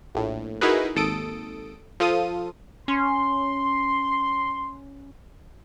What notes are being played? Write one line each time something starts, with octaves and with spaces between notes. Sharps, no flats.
A#1 A2
D#4 E4 F#4 G#4 A#4 B4
G#1 D#2 A4 D#6 D7
F3 F4 A4 D#6 D#7
C#4 C6